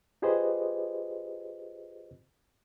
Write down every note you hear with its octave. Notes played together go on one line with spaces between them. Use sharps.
F4 G4 G#4 B4 C5 D#5